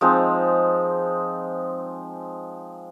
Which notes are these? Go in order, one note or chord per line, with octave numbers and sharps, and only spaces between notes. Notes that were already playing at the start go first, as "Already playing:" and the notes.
F3 G#3 C4 D#4